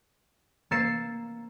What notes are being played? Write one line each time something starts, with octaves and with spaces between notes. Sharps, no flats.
A#3 E6 A6 C7 C#7 E7